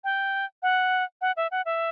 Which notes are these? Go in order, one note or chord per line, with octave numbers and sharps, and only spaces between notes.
G5
F#5
F#5
E5
F#5
E5